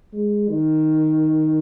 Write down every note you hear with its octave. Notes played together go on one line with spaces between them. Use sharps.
G#3
D#3